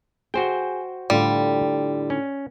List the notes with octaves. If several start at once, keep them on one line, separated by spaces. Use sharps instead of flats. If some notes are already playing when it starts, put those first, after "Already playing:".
F#4 G#4 C5 G5
A2 D3 G3 F4
C#4